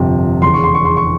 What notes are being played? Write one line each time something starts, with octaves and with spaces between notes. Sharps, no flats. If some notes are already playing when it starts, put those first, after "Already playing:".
Already playing: G1 F2 C3 F3
E1 E2 C#3 C6
C#6
C6
C#6
C6
C#6